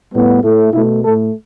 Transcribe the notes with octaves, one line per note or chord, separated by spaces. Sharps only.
A2 G3 B3
A2 A3
B2 A3 E4
A2 A3 A4